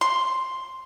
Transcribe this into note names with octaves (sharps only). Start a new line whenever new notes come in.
C6